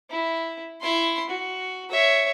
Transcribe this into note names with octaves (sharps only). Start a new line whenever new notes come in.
E4
E4 C6
F#4
C#5 E5